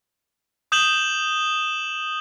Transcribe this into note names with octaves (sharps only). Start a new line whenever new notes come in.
D#6 G6 E7 F#7 G7